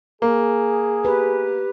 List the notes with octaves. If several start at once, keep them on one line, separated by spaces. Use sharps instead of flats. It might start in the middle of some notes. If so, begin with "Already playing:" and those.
A#3 G#4
G4 B4